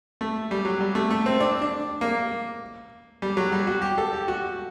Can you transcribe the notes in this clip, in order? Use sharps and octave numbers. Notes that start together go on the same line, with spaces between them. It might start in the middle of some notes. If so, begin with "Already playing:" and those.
A3
G3
F#3
G3
A3
A3
C4
D4
D4
A#3
G3
F#3
G3
F#4
G4
A4
G4
F#4